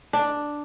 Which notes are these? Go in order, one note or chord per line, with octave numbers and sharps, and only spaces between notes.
D4